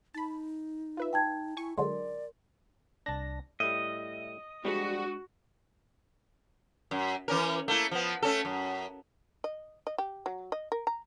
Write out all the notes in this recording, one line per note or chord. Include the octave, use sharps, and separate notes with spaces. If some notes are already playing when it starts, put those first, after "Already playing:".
D#4 A5 B5
F4 B4 E5
D#4 G5 A5 G#6
E4 G#5 C#6
D3 F#3 G#3 A#4 D5 C6
C2 D4 A5 A#6
A2 G3 D#5 E5
F3 G3 G#3 D4 F#4
F#2
E3 C#4 A#4
A3 A#3 E4
F3 B3
A3 C#4 A4
F#2
D#5
D#5
G4
F#3
D#5
A#4
A#5